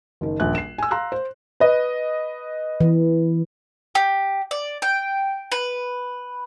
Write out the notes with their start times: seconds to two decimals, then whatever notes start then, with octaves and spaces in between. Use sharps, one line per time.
0.21 F#1 D#3
0.40 D#1 A#1 F#6
0.55 C7 E7
0.78 G#5 E6
0.91 F5 A#5 C6 E6 F#6
1.12 C5
1.60 B4 D#5
2.80 E3
3.95 G4
4.51 D5
4.82 G5
5.52 B4